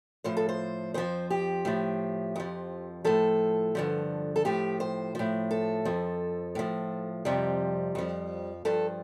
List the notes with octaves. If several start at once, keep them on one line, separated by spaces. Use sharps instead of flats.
A2 F3 C5
A4
C5
F2 F3 C5
G4
A2 F3
F2 F3
A2 F3 A4
G2 D3 F3
A4
A2 F3 G4
C5
A2 F3
A4
F2 F3
A2 F3
F2 C3 F3 G3
F2 F3
G2 F3 A4